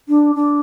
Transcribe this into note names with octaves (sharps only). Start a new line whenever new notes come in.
D4
D4